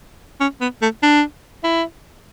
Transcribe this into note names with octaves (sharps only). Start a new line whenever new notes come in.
C#4
B3
A3
D4
E4